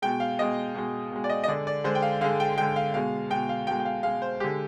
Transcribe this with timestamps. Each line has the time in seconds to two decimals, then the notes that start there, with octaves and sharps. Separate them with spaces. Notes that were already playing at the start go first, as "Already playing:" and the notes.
0.02 B2 G#3 G5
0.20 F5
0.39 B2 G#3 D#5
0.75 B2 G#3
1.12 B2 G#3
1.24 D5
1.29 D#5
1.44 D#5
1.48 D3 G#3 D5
1.67 D5
1.84 D3 G#3 C5
1.95 G5
2.02 F5
2.21 D3 G#3 F5
2.40 G5
2.57 D3 G#3 G5
2.76 F5
2.94 B2 G#3 F5
3.30 B2 G#3 G5
3.49 F5
3.67 B2 G#3 G5
3.80 G5
3.85 F5
4.03 B2 G#3 F5
4.22 C5
4.40 D3 G#3 G4